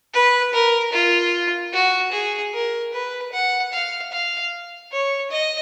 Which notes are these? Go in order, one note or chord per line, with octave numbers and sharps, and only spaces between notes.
B4
A#4
F4
F#4
G#4
A#4
B4
F#5
F5
F5
C#5
D#5